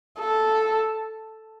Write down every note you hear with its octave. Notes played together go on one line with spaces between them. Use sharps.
A4